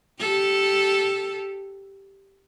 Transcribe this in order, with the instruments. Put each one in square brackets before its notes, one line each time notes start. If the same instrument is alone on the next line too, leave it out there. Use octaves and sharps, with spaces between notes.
[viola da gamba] G4 A4